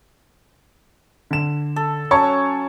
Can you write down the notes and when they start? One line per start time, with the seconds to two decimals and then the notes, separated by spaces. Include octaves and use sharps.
1.31 D3 E7
1.76 A4
2.11 F#3 C#4 C#5 A5 C#6